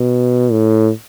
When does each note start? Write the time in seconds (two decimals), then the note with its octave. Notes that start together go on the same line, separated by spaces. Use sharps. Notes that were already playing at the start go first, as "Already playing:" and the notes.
Already playing: B2
0.52 A2